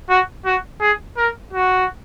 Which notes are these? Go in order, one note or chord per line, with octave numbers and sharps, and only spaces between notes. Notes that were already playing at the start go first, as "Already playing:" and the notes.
F#4
F#4
G#4
A#4
F#4